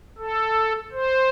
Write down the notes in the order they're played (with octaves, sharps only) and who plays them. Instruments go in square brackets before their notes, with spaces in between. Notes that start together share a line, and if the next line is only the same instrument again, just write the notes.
[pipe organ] A4
C5